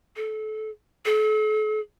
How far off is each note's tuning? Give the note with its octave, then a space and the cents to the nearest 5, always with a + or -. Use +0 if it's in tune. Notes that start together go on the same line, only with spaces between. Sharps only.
A4 -25
A4 -40